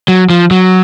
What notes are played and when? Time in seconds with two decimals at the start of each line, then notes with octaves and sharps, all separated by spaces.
0.08 F#3
0.30 F3
0.51 F#3